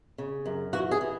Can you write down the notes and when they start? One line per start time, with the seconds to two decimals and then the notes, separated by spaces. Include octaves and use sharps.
0.18 C#3
0.46 F#2
0.73 E3 F#4
0.91 G#4
1.01 E3